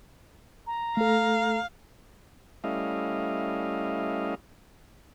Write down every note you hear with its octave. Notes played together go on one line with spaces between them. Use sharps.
A#5
A3 A4 F5
G3 A3 C#4 E4 D#5 F5